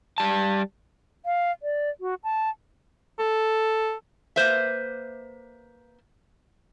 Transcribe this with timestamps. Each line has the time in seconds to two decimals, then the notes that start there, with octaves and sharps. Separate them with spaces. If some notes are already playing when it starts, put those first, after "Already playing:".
0.18 G3 A5
1.26 F5
1.63 D5
2.01 F#4
2.24 A5
3.19 A4
4.36 A#3 B4 C5 E5